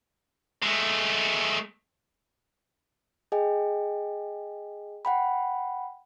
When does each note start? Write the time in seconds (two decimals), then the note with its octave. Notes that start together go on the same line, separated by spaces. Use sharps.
0.63 G#3 A3
3.32 G#4 D#5 G5 G#5
5.05 F#5 G5 B5